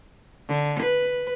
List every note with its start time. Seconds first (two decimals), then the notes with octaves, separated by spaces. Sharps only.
0.49 D3
0.83 B4